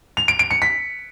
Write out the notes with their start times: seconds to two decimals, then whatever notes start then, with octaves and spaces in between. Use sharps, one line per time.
0.17 F7
0.28 D7
0.39 D7
0.51 C#7
0.62 B6